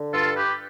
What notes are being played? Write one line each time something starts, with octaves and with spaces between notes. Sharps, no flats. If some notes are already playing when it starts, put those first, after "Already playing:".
Already playing: D3
G2 F4 A4
G4 B4